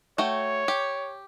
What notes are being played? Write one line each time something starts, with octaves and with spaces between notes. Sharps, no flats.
A3 F#4 C#5 G5
G4